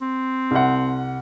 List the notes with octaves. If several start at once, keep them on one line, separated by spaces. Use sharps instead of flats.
C4
C2 F#5